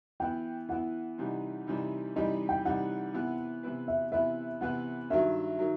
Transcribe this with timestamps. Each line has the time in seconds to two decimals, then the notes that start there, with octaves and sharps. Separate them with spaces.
0.20 E3 B3 E4 G5
0.69 E3 B3 E4 F#5
1.18 C3 E3 G3 D#4
1.67 C3 E3 G3 D#4
2.16 C3 E3 G3 D#4 D#5
2.49 G5
2.65 C3 E3 G3 D#4 F#5
3.14 C3 E3 B3 E4 B4
3.63 C3 E3 B3 E4 B4
3.88 E5
4.12 C3 E3 B3 E4 B4 E5
4.61 C3 E3 B3 E4 B4 F#5
5.10 G2 D#3 F#3 E5
5.59 D#3 F#3